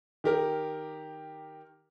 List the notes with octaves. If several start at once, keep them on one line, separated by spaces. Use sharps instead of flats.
D#3 G4 A#4